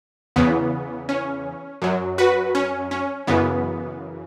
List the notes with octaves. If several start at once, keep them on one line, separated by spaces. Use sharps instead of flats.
E2 C#3 E3 B3
C#4
F#2 F#3
F#4 B4
C#4
C#4
F#2 C#3 E3 B3